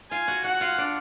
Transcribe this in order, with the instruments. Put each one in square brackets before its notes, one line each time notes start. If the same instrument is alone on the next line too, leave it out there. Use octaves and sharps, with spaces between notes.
[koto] F4 [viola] G#5
[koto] F#4
[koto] F#4 [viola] F#5
[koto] F4
D4